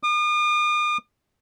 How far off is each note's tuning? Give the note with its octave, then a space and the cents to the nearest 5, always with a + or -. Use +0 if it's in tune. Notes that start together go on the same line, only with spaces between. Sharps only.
D#6 -45